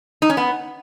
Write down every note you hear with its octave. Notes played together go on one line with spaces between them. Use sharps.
D#4
C#4
B3